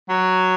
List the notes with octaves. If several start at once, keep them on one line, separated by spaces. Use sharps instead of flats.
F#3